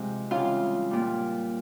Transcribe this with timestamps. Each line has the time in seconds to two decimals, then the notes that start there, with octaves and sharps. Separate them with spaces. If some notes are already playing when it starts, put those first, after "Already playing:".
Already playing: C3 F3 G#3
0.31 C#3 E3 G3 F4 F5
0.91 A#2 G3